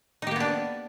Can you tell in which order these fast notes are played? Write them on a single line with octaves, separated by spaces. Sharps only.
D#4 G4 A#3 B3 D4